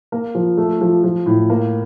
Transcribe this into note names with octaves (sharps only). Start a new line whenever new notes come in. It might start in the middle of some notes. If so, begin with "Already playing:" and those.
A#3
F3
A3
F3
F3
A2
A#3